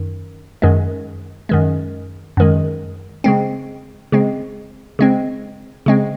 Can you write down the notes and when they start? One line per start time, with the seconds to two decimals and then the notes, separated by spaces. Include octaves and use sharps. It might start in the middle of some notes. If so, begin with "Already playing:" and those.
Already playing: F#2 D#3
0.62 F#2 D#3 G#3
1.49 F#2 D#3 G#3
2.37 F#2 D#3 G#3
3.24 C#3 G#3 C4
4.12 C#3 G#3 C4
4.99 C#3 G#3 C4
5.86 C#3 G#3 C4